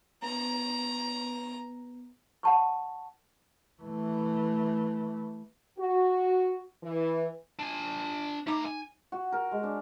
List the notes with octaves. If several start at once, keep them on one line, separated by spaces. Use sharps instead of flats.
B3 A#5
F#5 A5 C#6
E3 A3
F#4
E3
D4 G#5
A3 D#4 A#5 D6
G#5
F#4
A#4
G#3
D4